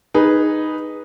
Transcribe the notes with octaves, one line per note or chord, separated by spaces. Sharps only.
D#4 G#4 B4